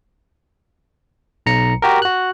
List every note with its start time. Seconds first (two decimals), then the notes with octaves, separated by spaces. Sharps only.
1.46 B1 A#5 C#7
1.82 F#4 G4 A#4
2.02 F#4 F#6